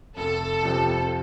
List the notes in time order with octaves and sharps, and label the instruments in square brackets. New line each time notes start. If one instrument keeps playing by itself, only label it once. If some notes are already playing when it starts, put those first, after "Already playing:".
[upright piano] F1 [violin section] A4
[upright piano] F2 C3 F3 C4